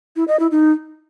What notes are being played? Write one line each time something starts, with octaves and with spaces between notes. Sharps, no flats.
E4
D#5
E4
D#4